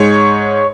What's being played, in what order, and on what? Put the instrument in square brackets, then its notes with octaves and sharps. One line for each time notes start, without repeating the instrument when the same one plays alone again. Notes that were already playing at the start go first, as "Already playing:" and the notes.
Already playing: [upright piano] G#2 G#3 C#5